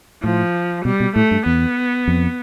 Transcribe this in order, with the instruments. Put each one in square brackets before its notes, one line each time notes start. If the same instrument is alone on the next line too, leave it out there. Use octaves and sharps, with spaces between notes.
[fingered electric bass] A2 [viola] F3
[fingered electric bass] B2 [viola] G3
[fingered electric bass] B2
[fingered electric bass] A2 [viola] A3
[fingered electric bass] G2
[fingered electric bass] E2 [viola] B3
[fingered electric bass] F2